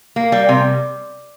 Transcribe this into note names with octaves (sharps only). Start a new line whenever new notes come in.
A#3
G3
C3